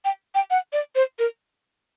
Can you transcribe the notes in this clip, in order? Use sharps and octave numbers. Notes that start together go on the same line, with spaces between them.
G5
G5
F#5
D5
C5
A#4